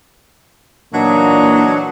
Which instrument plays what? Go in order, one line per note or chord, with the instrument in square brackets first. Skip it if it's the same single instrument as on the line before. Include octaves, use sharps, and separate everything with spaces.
[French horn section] A#2 E3 A#3 [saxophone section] F#3 [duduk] D4 [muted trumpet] D#4